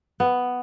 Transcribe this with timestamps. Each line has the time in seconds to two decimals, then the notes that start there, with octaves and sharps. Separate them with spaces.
0.20 B3